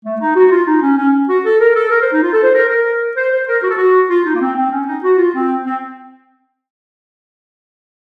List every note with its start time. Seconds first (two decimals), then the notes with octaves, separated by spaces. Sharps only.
0.04 A3
0.20 D#4
0.35 F#4
0.51 F4
0.66 D#4
0.82 C#4
0.98 C#4
1.28 F#4
1.45 A4
1.60 A#4
1.75 A4
1.91 A#4
2.01 C5
2.11 D#4
2.23 F4
2.33 A4
2.43 C5
2.53 A#4
2.68 A#4
3.16 C5
3.31 C5
3.47 A#4
3.62 F#4
3.70 A4
3.76 F#4
4.09 F4
4.25 D#4
4.34 A#3
4.41 C4
4.57 C4
4.71 C#4
4.87 D#4
5.03 F#4
5.18 F4
5.34 C4
5.65 C4